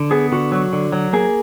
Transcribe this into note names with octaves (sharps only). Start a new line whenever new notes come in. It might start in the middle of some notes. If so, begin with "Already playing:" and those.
Already playing: D3
B3 G#4
D3 F#4
F#3
D3
F#3
A#3 G#4